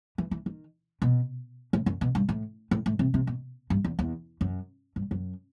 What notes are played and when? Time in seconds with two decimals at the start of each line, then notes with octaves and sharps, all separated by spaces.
0.18 E3
0.31 E3
0.46 D#3
1.02 B2
1.73 A2
1.86 F#2
2.01 B2
2.15 G2
2.29 A2
2.71 A2
2.86 A2
2.99 C3
3.14 C3
3.27 B2
3.70 G2
3.85 E2
3.99 E2
4.41 F#2
4.96 G2
5.11 F#2